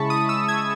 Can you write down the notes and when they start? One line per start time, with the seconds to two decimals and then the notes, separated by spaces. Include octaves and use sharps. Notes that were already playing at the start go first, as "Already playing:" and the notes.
Already playing: C#3 G#3 E4 A5 B5 C#6
0.10 D#6
0.29 E6
0.48 G#6